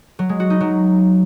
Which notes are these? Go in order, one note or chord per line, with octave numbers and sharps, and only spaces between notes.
F#3
G#3
F#4
D#4
F#3